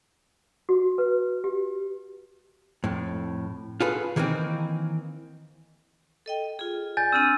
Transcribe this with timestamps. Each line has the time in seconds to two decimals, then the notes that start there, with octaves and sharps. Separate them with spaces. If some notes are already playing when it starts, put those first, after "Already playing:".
0.69 F#4
0.98 B4
1.44 G4
2.84 F2 A2
3.81 F4 F#4 G#4 A4 B4
4.16 D#3 E3 G3 A#3 C4 D#4
6.26 A4 D#5 G5
6.59 F4 G#4
6.97 D5 G#5 G6 A6
7.12 C4 D4 E6 F6 D#7